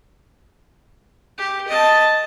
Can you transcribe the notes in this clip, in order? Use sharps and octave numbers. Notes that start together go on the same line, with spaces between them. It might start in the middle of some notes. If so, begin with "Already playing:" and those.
G4
D#5 A5